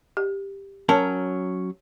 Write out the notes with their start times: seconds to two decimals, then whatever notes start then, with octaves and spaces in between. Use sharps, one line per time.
0.17 G4
0.89 F#3 C#4 A#4 C#5 A5